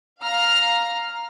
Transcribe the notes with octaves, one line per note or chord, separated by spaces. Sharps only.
F5 A#5 F6